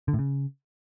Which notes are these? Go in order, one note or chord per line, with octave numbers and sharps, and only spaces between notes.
D3
A2
C#3